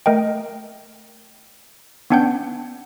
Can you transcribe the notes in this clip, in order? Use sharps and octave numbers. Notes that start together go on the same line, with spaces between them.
A3 A#4 D#5 G5
B3 C#4 D4 F#5 G5 G6